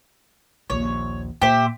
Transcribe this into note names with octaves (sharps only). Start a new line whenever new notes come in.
A#1 D#2 C#5
A#2 G4 C5 E5